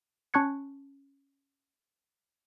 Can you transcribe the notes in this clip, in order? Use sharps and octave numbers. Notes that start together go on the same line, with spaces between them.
C#4 A5 C#6 F#6 G#6 C#7